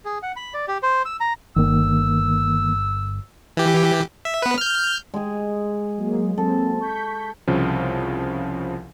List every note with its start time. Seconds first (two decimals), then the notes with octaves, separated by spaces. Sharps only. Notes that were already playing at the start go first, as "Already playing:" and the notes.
0.05 G#4
0.23 F#5
0.36 B5
0.54 D5
0.68 G4
0.83 C5
1.05 E6
1.20 A#5
1.56 G1 D#3 A#3 E6
3.57 E3 G4
4.25 E5
4.42 B3 B4
4.58 F6 G6
5.14 G#3 G#4
5.98 F#3 A#3 G#4
6.38 F#3 A#3 C4 A4
6.80 C#6 G6 B6
7.47 C2 C#3 F3